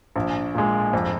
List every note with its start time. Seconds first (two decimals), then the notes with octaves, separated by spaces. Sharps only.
0.16 A#1
0.55 A#2 G#3
0.93 F2